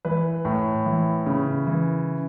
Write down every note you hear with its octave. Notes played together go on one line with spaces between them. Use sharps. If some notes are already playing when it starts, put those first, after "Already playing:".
E3 B4
A2
E3
C#3
E3